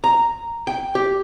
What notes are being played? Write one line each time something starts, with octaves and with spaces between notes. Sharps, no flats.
A#5
G5
G4